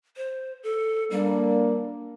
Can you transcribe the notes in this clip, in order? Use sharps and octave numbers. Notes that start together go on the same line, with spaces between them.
C5
A4
G3 A#3 D4